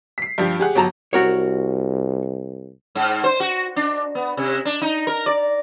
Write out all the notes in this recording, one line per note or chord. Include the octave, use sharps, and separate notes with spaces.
B6 C7
G2 F3 G4
G4 G#4 F#5
G1 F#3 A5 A#5
C2 F#4 A#4 C#5
G#2
C5
F#4
D4
B3
C3
D4
D#4
A#4
D5